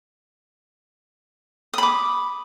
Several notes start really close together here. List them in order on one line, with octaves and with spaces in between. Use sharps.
D#6 B5 D6